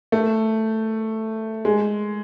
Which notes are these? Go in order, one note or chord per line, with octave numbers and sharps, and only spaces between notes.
A3
G#3